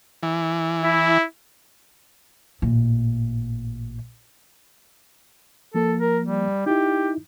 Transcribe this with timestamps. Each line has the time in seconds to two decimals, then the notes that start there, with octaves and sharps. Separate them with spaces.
0.23 E3
0.84 E4
2.62 A1 A#2
5.74 F3 A#3 A4
6.01 A#4
6.25 G3
6.66 D#4 E4 G4